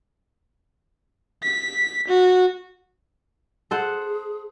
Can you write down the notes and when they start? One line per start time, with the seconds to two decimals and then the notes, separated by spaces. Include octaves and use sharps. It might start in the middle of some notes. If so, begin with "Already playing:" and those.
1.43 B6
2.08 F#4
3.71 G#4 A4 C5 F#5